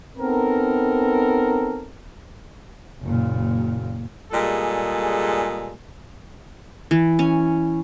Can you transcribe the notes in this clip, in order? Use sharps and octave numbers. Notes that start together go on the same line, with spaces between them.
B3 C4 D#4 A4 A#4
F#1 A#2
A#2 G3 G#3 G#4 A4
E3
C#4